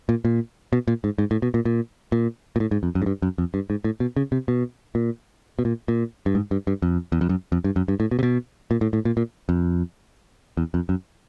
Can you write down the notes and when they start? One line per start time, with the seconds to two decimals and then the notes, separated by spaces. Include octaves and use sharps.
0.09 A#2
0.25 A#2
0.73 B2
0.88 A#2
1.04 G#2
1.18 G#2
1.31 A2
1.42 B2
1.54 A#2
1.65 A#2
2.12 A#2
2.56 A#2
2.60 A2
2.71 G#2
2.83 F2
2.95 F#2
3.02 G#2
3.06 G2
3.22 F#2
3.38 F2
3.54 G2
3.70 G#2
3.84 A2
4.00 B2
4.16 C#3
4.32 C3
4.48 B2
4.95 A#2
5.59 B2
5.65 A#2
5.88 A#2
6.26 G2
6.35 G#2
6.51 G2
6.67 G2
6.82 F2
7.12 E2
7.21 F2
7.29 F#2
7.52 F2
7.64 G2
7.76 F#2
7.88 G2
8.00 A2
8.11 B2
8.19 C3
8.23 B2
8.71 A#2
8.81 A2
8.93 A2
9.05 A#2
9.17 A#2
9.49 F2
10.57 E2
10.74 F2
10.89 F#2